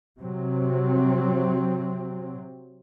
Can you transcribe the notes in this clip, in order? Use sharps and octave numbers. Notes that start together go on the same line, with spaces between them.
C3 F#3 C4